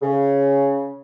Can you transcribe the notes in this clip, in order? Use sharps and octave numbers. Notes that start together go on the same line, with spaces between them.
C#3